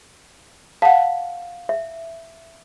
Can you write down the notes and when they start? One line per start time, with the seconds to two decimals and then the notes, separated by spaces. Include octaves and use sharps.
0.82 F5 F#5 A5
1.69 E5